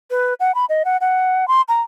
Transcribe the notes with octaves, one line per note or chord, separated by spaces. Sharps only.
B4
F#5
B5
D#5
F#5
F#5
C6
A#5